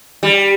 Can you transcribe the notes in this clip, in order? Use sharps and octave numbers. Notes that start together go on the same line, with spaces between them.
G3